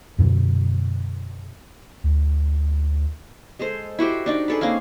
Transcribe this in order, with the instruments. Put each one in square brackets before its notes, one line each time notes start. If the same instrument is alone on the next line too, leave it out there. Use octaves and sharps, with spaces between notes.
[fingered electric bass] F#2 B2 D3 F#3
[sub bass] D2
[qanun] G#3 G#4 A4 C5
E4 F#4 G4 C5
D4 D#4 D5
G#4 A4 B4
A#3 C4 C#4 F5